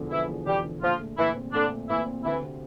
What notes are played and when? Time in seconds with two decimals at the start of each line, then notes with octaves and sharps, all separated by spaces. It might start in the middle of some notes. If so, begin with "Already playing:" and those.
Already playing: E1 E2 D3 F3
0.11 E3 F3 E4
0.29 E2
0.46 E1 G3 G4
0.65 D3
0.82 A#2 F3 F4
1.00 A3
1.17 A#2 E3 E4
1.35 C4
1.53 A#2 D3 D4
1.70 A3
1.89 A#2 E3 E4
2.06 C4
2.24 D2 E3 E4
2.42 C3